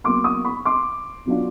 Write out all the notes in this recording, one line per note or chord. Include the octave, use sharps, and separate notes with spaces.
B2 F#3 A#3 C6 D6
C#6 D#6
B5 C#6
C6 D6
B2 F#3 B3 D4 F4